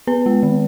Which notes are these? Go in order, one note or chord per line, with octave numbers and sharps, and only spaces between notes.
B3 B4
G#3
D#3